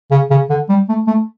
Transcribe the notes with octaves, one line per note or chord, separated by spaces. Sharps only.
C#3
C#3
D3
G3
A3
A3